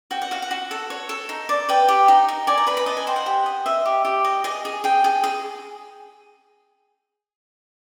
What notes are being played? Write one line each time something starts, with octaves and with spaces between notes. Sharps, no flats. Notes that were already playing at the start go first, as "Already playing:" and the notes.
F#4 G5
F#5
F#4 F5
F#5
F#4
A4
C#5
A4
D#4
D5
B4 G5
G4
D#4
D#4
D5 G#5
A#5
B4 B5
B5
D#5 A5
G#5
C5 G5
F#5
G4
D#5
D#5 E5
G4
G4
D#5
G#4 D#5
G#4
G#4 G5
G#4
G#4